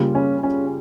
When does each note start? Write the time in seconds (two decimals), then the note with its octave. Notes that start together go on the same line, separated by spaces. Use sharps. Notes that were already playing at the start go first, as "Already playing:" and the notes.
Already playing: C#3 G3 A#3 F4
0.15 C#4
0.43 C#4